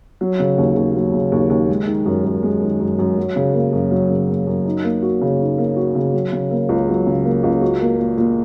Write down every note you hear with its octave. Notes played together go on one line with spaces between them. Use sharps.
F#3
C#3
D#2
D#2
F#3
C#3
D#2
D#2
G#3
D#3
F#2
F#2
G#3
D#3
F#2
F#2
F#3
C#3
A#3
F#2
F#3
C#3
A#3
F#2
D#4
A#3
F#4
C#3
D#4
A#3
F#4
C#3
F#3
C#3
A#3
C#2
F#3
C#3
A#3
C#2
F#4
A#3
A#2
A#2